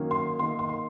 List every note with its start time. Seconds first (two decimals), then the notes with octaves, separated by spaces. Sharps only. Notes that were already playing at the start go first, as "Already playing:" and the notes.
Already playing: D#3 F#3 A#3 C#4
0.11 C6
0.39 D#3 A#3 D#4 C6
0.59 C6
0.69 C6